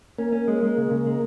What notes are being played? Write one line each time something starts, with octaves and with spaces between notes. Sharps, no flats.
A#3 C#4
C#4
G#3
G#3
C#3
C#3
G#3